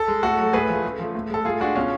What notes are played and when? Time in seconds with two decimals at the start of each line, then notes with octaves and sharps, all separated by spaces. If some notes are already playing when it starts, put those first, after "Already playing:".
Already playing: A4
0.08 G#3
0.23 A2 F#4 A4
0.38 F#3 A3
0.53 A2 G#4 B4
0.69 F3 A3
0.84 C#3
1.00 F3 A3
1.15 A2
1.30 G#3 A4
1.45 A2 F4 G#4
1.60 G#3 D4 F#4
1.76 B2 C#4 F4